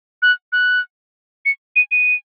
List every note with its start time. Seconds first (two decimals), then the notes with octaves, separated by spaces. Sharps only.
0.22 F#6
0.52 F#6
1.45 C#7
1.76 D#7
1.91 D#7